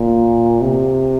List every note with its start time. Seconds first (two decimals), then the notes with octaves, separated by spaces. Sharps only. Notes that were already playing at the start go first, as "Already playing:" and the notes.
Already playing: A#2
0.62 C3